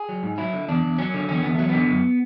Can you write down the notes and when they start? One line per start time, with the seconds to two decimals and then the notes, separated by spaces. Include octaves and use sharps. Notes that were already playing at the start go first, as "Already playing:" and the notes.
Already playing: G#4
0.09 F#3
0.23 G#2
0.38 F#3 E4
0.53 D3
0.68 E2 D4
0.83 E2
0.99 F#3 C#4
1.14 D3
1.28 E2 C#4
1.43 E2 B3
1.55 F#3 A3
1.69 D3 B3
1.89 F#2